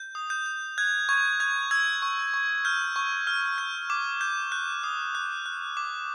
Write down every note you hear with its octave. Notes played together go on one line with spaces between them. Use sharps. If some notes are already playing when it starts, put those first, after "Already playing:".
Already playing: G6
D#6
G6
G6
F#6 G#6
C#6 G#6
F#6 G#6
E6 G#6
C#6
C#6
F6 G6
C#6
F6
G6
D6
G6
F#6 G6
D#6
F#6
F#6
D6